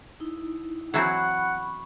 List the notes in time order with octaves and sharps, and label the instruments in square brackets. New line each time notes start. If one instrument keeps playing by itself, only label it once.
[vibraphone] D#4 E4
[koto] E3 F#3 C4 [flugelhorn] F#5 [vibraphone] B5 C#6